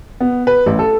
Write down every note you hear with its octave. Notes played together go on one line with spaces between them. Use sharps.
B3
B4
A1
A4